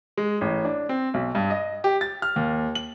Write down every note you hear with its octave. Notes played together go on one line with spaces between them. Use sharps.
G#3
A1
D4
C4
B1
G2
D#5
G4
A6
F6
D#2
F#7